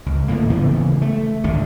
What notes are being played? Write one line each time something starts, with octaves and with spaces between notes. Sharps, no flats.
C#2
A2 D3 A#3
C#3 E3 A3 B3
A3
G#1 C#2 D3